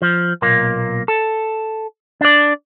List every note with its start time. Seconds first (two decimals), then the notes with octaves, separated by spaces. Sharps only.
0.02 F3
0.42 B1 A#2 A#3
1.08 A4
2.21 D4 D5